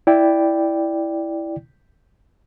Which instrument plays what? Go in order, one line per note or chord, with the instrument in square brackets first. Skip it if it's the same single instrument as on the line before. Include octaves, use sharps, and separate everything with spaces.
[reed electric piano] E4 D5 G5